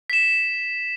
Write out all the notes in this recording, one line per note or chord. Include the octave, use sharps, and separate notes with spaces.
B6 E7